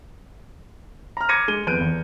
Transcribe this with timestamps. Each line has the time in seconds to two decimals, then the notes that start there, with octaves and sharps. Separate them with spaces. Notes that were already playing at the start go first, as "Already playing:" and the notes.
1.17 A#5 F6
1.29 D6 G#6 A#6 C#7 D#7
1.48 G#3 D#7 G7
1.67 F2 B3 F#6 G6 D7 D#7
1.81 E2